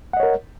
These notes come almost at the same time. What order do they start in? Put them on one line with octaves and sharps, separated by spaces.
F#5 D#5 C#5 A#4